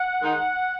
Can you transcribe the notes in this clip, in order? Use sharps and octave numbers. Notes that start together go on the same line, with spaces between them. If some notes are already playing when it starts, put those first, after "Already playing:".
Already playing: F#5
D#3 G#3 D#4